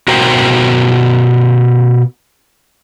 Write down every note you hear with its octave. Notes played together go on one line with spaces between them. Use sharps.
B2 F#4 A#4 C5 G5